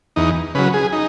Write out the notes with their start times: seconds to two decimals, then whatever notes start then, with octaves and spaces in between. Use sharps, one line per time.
0.16 E2 D#4
0.55 C#3 F#3 B4
0.73 G#4
0.93 D#4